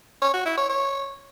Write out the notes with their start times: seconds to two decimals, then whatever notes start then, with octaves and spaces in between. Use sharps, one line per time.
0.22 C#5
0.34 F#4
0.46 E4
0.58 C#5
0.69 C#5